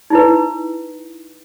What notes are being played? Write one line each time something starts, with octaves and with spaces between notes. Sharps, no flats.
D#4 E4 B4